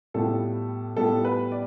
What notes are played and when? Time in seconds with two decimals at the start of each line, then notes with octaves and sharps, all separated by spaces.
0.14 A2 G3 B3 F4 A4
0.97 A2 G3 B3 F4 A4
1.25 B4
1.52 D5